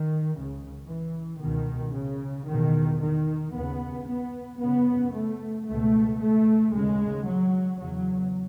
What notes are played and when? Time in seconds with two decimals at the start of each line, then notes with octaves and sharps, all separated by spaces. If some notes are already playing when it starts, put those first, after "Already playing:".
Already playing: D#3
0.33 C#2 C#3
0.87 E3
1.40 C#2 B2 D#3
1.94 C#3
2.47 E2 D#3
2.52 B2
3.01 D#3
3.54 D#2 C#3 B3
4.07 B3
4.59 F#2 C#3 B3
5.14 A3
5.67 C#2 B2 A3
6.20 A3
6.73 D#2 C#3 G#3
7.26 F#3
7.80 E2 C#3 F#3